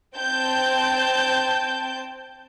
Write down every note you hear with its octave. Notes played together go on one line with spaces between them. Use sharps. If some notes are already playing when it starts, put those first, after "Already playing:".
C4 G5 A5 G6